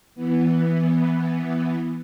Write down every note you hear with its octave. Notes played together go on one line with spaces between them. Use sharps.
E3 B3